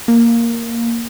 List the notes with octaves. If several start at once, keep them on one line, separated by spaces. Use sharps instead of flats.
A#3